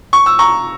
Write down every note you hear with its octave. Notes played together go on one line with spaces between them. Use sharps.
C#6
E6
A#5 C#6